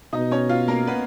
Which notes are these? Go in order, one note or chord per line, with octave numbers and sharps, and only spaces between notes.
B2 D#4 D#5
C#4 C#5
F4 F5
A#3 A#4
B3 B4